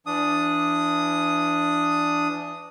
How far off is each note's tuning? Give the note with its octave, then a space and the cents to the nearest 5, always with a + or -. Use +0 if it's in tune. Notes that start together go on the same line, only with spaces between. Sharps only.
E3 +35 D4 +0 D#6 +0